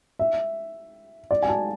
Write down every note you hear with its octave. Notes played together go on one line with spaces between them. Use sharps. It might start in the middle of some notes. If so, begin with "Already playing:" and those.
E5
D5
G#5
A5